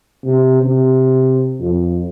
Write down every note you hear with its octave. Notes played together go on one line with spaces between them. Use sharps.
C3
C3
F2